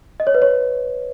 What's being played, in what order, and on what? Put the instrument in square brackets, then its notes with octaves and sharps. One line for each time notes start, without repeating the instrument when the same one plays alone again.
[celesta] D#5
C#5
B4
C#5